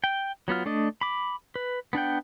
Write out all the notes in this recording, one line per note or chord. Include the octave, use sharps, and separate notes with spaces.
G5
F#3 B3 F4 F6
A3 D4 D5 D#5
B5 D6
B4
B3 D4 F#5 G5